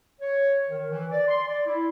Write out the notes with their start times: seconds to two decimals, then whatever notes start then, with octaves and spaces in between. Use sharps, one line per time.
0.21 C#5
0.68 D#3
0.91 E3
1.12 D5
1.28 C6
1.48 D5
1.66 E4